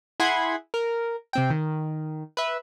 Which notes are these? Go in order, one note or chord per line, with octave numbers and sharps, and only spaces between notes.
E4 G#4 F#5 B5 C6 G#6
A#4
C3 C4 G5
D#3
B4 E5